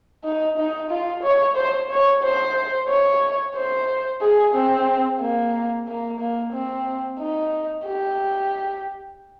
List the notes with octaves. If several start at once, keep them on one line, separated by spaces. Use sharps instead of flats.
D#4
D#4
F4
C#5
C5
C#5
C5
C#5
C5
G#4
C4
A#3
A#3
A#3
C4
D#4
G4